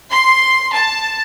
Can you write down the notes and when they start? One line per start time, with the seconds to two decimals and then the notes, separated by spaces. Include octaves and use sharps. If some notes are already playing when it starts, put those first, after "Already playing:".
0.10 C6
0.73 A5